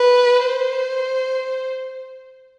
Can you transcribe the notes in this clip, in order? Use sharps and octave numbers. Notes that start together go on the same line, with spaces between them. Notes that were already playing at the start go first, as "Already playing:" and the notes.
Already playing: B4
C5